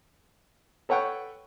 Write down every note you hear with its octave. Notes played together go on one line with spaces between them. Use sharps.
A4 B4 C#5 F#5 G5